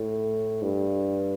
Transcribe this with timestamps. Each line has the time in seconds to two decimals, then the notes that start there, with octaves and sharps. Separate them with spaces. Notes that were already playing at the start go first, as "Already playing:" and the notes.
Already playing: A2
0.62 G2